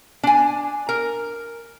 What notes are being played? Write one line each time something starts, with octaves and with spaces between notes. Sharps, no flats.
D4 G#5
A#4